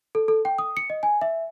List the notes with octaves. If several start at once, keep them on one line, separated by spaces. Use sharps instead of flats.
A4
A4
G5
D#6
C#7
D#5
G#5
E5